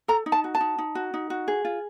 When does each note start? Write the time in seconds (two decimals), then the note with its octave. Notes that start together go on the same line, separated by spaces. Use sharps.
0.08 A4 A#5
0.26 D#4
0.32 A5
0.44 F#4
0.55 A5
0.60 D#4
0.78 D#4
0.95 F#4
1.14 D#4
1.30 F#4
1.48 G#4
1.65 F4